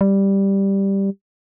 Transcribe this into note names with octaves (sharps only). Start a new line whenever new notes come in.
G3